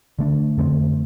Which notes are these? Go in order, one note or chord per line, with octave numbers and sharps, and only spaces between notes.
D3 A3 D4
F2 D3 A3 C4